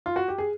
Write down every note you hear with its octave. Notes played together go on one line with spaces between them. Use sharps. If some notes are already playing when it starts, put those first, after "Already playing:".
F4
F#4
G4
G#4